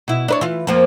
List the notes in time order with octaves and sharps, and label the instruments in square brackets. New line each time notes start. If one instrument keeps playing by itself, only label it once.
[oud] B2 E4
D4 B4 C#5
E3 F4
F2 F3 A#3